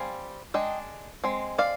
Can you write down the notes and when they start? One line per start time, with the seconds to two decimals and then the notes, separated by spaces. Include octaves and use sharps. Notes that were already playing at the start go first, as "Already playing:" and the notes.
Already playing: G3 C4 F5 G#5
0.54 G#3 D4 D#5 G5
1.24 G#3 C4
1.58 D5 F5